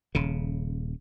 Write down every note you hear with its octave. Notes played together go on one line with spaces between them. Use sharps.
D#1 C#3